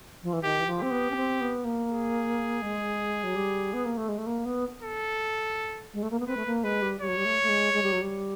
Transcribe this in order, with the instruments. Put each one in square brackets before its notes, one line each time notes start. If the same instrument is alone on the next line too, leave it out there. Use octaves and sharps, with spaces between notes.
[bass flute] F3
E3
[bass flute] D#3 [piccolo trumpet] G4
[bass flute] E3
F3
[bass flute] C4 [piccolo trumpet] G4
[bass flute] B3
C#4
C4
B3
A#3
[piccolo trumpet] G#4
[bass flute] G#3
F#3
G3
B3
A#3
A3
G#3
A3
A#3
B3
[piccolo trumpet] A4
[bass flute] G#3
A3
A#3
B3
[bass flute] C4 [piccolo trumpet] B4
[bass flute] A3
A#3
[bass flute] G#3 [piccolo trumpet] B4
[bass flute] G3
[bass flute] G3 [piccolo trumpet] C#5
[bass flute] F#3
G3
A3
A3
G#3
G#3
G3
F#3
G3